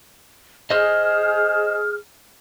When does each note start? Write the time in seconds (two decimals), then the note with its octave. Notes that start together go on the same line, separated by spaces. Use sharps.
0.70 G#4 C5 D#5 F6